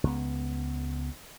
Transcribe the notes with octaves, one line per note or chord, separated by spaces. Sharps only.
C#2 B3